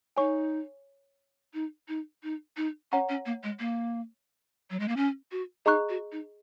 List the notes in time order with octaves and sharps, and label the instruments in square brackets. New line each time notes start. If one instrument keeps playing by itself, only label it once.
[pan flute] D#4 [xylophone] C#5 G#5 C#6
[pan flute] D#4
D#4
D#4
D#4
[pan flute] C#4 [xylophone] C#5 F#5 A#5 C#6
[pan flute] C#4
A#3
G#3
A#3
F#3
G#3
A#3
C#4
F#4
[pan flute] D#4 [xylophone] G#4 D#5 A#5 C#6 F#6
[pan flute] F#4
D#4